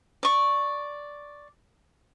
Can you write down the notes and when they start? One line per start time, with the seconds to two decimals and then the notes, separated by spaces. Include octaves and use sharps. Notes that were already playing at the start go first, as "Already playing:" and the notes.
0.23 D5 C#6